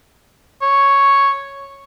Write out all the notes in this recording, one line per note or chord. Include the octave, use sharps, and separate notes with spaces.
C#5